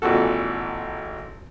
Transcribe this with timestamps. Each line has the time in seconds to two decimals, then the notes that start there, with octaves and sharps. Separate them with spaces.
0.02 G#1 A#2 E3 F#4 A4